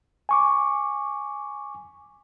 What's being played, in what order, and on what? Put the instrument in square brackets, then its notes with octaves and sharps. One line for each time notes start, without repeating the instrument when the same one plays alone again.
[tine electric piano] G#5 C#6 D6